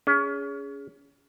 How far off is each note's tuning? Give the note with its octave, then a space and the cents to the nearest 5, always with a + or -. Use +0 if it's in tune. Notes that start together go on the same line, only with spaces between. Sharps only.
C#4 +30 G#4 +0